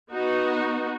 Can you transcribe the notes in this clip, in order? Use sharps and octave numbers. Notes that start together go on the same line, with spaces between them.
B3 D#4 F#4